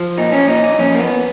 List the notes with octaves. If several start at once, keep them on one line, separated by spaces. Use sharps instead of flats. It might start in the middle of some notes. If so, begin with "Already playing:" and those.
Already playing: F3
A#2 D#4
C#4
A#2 D#4
D#4
F2 C#4
A#3
B3